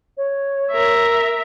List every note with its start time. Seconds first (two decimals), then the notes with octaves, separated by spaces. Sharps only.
0.17 C#5
0.72 A#4 E5